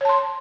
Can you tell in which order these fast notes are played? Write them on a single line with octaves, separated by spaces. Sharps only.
C#5 A5 C6